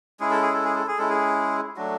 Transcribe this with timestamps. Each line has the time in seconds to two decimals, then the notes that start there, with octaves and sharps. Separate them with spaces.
0.20 G#3 C#4 E4 G#4
0.31 A4
0.42 G#4
0.53 A4
0.65 G#4
0.75 A4
0.88 G#4
0.98 G#3 C#4 E4 A4
1.10 G#4
1.76 F#3 A3 D4 F#4